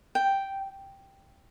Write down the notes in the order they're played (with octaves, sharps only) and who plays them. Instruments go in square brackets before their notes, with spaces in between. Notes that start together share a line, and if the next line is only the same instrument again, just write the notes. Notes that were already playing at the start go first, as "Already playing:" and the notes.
[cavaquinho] G5